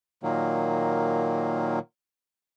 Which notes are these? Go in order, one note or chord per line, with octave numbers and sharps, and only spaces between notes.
A#2 D#3 F#3 A#3